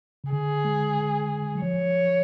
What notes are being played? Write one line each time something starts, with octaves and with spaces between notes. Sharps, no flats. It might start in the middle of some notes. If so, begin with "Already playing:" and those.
C#3
D3 G#4
G#3
F#3
F3 C#5